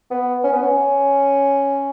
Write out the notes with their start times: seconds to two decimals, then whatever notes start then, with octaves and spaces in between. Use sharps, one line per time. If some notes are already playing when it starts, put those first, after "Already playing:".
0.11 B3
0.43 C#4
0.53 B3
0.62 C#4